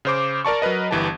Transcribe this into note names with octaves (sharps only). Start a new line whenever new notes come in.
C#3 C5 D6
A#4 D5 A5 C#6
F#3 A#4 B4 D#5
G1 E3 G4 A5